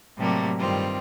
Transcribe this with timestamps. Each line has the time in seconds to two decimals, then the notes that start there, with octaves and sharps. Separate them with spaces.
0.17 A2 C3 F#3 G3 A3 A#3
0.59 G2 D#3 G3 C4 F4